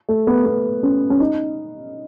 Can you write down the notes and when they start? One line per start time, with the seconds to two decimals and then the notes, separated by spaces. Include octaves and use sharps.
0.09 A3
0.27 B3
0.46 B3
0.83 C#4
1.10 C#4
1.20 D#4